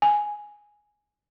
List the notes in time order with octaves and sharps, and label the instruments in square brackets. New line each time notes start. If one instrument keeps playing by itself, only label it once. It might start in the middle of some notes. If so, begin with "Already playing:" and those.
[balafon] G#5